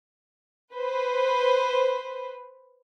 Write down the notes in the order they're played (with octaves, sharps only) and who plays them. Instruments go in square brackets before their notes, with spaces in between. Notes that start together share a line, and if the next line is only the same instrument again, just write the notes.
[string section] B4 C5